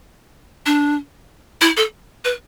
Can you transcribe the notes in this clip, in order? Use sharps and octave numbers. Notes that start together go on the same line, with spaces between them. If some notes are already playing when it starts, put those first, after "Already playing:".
D4
E4
A4
B4